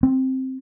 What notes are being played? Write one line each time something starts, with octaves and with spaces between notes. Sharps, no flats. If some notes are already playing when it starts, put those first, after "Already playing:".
C4